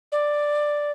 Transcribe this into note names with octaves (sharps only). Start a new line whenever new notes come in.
D5